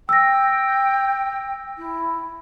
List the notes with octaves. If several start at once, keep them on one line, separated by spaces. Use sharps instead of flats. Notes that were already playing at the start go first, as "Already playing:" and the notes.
G5 E6 A#6
E4